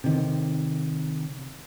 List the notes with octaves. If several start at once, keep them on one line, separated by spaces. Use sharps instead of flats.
C3 D#3